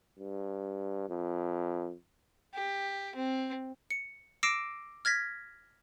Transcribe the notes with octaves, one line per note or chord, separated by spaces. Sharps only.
G2
F2
G4
C4
C#7
D6 E6 A#6 C7 D7 E7
F6 G#6 A#6 B6